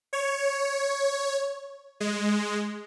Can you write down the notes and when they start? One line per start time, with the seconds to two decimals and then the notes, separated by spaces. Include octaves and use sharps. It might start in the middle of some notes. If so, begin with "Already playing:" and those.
0.13 C#5
2.00 G#3